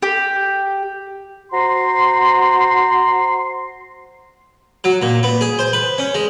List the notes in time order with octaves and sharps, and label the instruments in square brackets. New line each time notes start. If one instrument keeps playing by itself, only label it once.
[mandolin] G4
[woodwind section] F#4 C5 A#5 C6
[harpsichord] F#3
A#2
B3
G#4
C5
B4
C#4
G#3